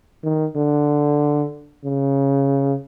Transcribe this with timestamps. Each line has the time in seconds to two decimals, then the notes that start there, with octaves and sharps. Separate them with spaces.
0.24 D#3
0.56 D3
1.85 C#3